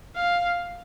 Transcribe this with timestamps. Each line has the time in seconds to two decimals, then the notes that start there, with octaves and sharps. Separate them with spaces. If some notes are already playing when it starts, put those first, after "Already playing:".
0.16 F5